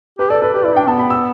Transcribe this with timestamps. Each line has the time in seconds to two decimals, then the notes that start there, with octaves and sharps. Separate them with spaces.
0.19 G4 B4
0.30 A4 D5
0.42 A4 B4
0.54 G4 B4
0.64 E4 D5
0.76 D4 G5
0.87 B3 A5
0.99 B5
1.10 E6